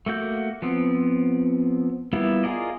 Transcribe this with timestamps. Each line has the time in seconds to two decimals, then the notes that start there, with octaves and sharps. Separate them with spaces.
0.06 A3 A#3 F#4 G6
0.62 F3 B3 C4
2.13 G3 A#3 B3 E4 F4
2.43 F4 G#4 A#4 D5 D#5